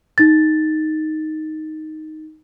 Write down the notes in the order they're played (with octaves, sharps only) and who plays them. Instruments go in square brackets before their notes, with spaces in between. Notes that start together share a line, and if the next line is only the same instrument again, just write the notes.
[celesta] D#4 A6